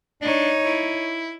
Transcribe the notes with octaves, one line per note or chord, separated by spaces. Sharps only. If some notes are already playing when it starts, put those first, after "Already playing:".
D4 D#4 C#5
E4